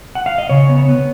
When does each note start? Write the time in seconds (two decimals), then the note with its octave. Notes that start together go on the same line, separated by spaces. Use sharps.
0.15 F#5
0.26 F5
0.38 D#5
0.50 C#3 C#5
0.69 B3
0.88 B3